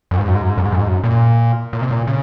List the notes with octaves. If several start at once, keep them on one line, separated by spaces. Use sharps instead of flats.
F#2
G#2
F#2
G#2
F#2
G#2
F#2
G#2
F#2
G#2
F#2
A#2
A#2
C3
A#2
C#3